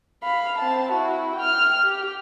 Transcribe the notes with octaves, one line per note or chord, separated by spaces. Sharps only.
F5 B5
C4 A5
E4 F#4
G5 F6
G4